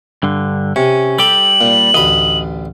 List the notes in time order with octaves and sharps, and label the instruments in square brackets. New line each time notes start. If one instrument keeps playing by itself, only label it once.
[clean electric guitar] G2 D3
[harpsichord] C3 [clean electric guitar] C#4
[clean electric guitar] G3 G4 [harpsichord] A4 [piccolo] F#7
[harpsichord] A#2
[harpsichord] A1 D2 B5 [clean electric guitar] D#5